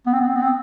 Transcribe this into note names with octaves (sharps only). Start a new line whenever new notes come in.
B3
C4
B3
C4
B3
C4